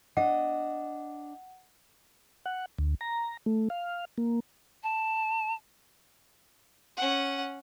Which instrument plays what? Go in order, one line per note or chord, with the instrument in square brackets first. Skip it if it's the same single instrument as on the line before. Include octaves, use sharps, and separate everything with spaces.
[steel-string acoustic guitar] D4 D#5 [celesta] F#5
[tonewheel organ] F#5
D2
A#5
A3
F5
A#3
[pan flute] A5
[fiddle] C#4 F#5